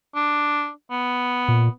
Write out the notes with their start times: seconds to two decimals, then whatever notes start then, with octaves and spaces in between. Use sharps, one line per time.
0.15 D4
0.91 B3
1.48 A#2